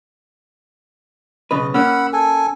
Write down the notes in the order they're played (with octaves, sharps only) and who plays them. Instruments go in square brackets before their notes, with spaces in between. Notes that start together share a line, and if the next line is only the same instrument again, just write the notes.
[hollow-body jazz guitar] B1 C#3 B4 [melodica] D#5
[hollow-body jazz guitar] A#3 C#4 [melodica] F#5 B5 E6
[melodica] A4 G#5